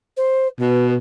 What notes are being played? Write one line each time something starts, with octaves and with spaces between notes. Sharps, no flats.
C5
B2 B4